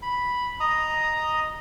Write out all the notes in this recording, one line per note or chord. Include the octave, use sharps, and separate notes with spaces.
B5
D#5 A#5 D#6